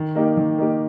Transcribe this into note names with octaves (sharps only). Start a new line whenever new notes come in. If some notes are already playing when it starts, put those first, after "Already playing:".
Already playing: D#3
A#3 D#4 G4
D#3
A#3 D#4 G4